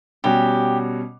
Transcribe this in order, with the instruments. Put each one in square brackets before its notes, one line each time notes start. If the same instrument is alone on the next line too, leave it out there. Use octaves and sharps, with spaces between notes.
[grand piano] B2 G3 C#4 F#4 [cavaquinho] G4